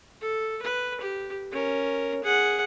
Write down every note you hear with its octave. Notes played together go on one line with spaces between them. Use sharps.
A4
B4
G4
C#4 A#4
G#4 F#5